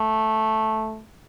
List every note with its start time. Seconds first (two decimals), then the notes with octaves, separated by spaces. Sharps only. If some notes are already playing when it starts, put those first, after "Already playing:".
Already playing: A3